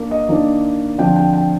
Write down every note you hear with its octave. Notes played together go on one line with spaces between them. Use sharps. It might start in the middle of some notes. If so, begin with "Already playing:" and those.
Already playing: A#3 D4
D#5
D#3 A#3 D4
D3 F3 C4 G5
G5
G5